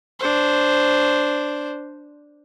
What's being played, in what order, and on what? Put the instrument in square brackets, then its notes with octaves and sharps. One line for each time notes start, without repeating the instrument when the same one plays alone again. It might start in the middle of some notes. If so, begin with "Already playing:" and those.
[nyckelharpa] D4 C5